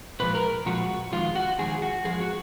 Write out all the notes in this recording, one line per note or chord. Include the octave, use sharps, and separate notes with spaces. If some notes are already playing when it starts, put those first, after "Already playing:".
A#2 F3 G#3 B4
A#4
A#2 F3 G#3 F#4
F2 D#3 G#3 F4
F#4
F2 D#3 G#3 G#4
F#4
F2 F3 G#3 G#4
F#4